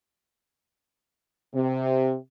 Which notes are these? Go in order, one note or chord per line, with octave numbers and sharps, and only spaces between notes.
C3